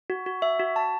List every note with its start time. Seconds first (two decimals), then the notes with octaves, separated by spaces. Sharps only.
0.10 F#4
0.26 F#4
0.42 E5
0.59 F#4
0.76 A5